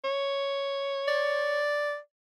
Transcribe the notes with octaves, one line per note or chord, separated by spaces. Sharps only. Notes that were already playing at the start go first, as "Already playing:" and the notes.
C#5
D5